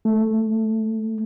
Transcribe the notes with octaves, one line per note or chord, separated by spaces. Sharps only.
A3